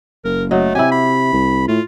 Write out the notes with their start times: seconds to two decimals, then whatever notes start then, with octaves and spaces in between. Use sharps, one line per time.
0.24 F#1 A#4
0.51 F#3 A3 D#5
0.75 C3 E4 G4 G#5
0.92 B5
1.33 C2
1.68 A2 F4